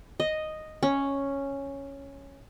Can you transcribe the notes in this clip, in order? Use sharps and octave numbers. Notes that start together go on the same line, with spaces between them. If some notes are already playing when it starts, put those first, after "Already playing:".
D#5
C#4